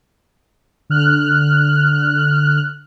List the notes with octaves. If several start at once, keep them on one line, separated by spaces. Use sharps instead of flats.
D3 F6 F#6